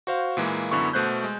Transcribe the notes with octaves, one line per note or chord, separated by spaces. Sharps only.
F#4 C5 F5
A#2 E3 G#3 A#3
F#2 D3 B3 E4 C#6
B2 A3 C5 F#6 G6
G#3